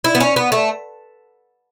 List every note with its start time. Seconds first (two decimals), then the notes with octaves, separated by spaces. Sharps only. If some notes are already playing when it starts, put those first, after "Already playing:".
0.04 E4
0.15 B3
0.20 C#4
0.36 B3
0.52 A3